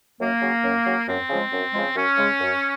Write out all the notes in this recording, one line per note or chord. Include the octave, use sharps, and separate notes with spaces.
F#2 A#3
C#3 F#3
F#2
C#3 F#3
F#2 C4
C#3 F3 G#3
F#2
C#3 F3 G#3
F#2 C#4
C#3 G#3
F#2